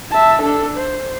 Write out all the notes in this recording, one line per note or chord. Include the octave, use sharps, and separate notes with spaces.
E5 A5
D4 A4
C5